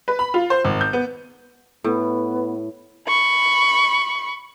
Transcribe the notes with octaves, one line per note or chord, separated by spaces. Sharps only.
B4
B5
F4
C5
G#1
G6
B3
A2 B3
B5 C#6